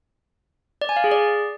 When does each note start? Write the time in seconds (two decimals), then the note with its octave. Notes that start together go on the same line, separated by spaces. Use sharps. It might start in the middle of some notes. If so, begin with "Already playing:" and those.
0.81 D5
0.89 G#5
0.96 F5
1.04 G#4
1.11 D5